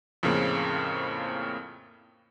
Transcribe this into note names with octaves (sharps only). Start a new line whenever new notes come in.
F2 A2 C#3 A#3 C4